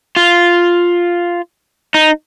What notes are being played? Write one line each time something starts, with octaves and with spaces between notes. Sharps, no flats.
F4
D#4